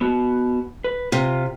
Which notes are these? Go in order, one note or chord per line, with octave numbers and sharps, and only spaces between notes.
B3 F#4
B4
C3 F4